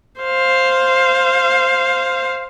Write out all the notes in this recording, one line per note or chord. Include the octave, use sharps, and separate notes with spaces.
C5 F5